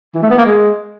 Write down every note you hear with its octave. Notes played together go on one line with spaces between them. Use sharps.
E3
A3
B3
A#3
G#3